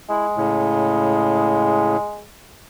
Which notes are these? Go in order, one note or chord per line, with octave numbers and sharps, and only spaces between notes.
G#3 E4
A2 C#3